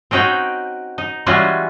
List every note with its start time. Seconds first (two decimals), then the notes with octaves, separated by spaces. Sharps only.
0.11 C4 C#4 D#4 F#4 G5
0.98 D#4
1.26 E3 G3 G#3 C#4 F4 F#4